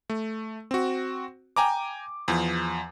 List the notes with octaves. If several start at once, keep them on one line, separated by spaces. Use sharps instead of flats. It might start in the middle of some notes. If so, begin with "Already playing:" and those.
A3
C4 F#4
G5 G#5 A#5 D6
E2 F3